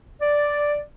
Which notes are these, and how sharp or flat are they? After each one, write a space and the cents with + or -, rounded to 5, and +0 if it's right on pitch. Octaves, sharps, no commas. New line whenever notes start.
D5 +0